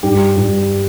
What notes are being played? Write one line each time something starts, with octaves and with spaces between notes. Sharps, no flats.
G2 G4
G2